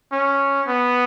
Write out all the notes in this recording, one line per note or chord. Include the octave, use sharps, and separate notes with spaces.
C#4
B3